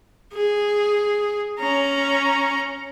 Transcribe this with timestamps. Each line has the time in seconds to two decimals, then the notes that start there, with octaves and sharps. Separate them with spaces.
0.34 G#4
1.60 C#4 A#5